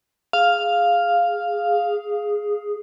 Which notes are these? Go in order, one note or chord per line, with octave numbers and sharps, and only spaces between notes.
G#4 F5